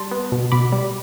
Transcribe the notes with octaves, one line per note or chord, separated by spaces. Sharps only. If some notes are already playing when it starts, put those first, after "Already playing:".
Already playing: G3 A5 C6
B3
B2
B2 B5 D6
G3